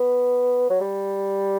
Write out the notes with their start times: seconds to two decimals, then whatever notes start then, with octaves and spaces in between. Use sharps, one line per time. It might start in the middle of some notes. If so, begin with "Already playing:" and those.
Already playing: B3
0.69 F#3
0.81 G3